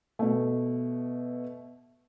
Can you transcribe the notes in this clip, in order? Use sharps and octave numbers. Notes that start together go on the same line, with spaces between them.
B2 A3